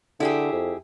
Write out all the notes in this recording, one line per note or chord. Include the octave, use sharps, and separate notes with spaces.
D3 E4 G4 G#4
F2